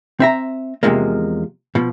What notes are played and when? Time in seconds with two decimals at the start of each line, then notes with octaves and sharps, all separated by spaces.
0.20 C4 E5 A#5
0.83 E2 G#2 C3 F3 G#3 A#3
1.75 B2 F3